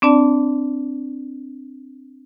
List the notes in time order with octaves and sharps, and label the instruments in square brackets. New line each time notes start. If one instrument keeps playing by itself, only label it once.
[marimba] C4 D4 D5 A5